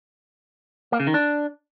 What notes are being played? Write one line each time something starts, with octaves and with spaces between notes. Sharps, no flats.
A#3
C#3
D#3
D4